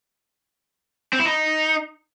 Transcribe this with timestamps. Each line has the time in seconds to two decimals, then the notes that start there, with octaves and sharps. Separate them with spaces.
1.13 C4
1.19 E4
1.26 D#4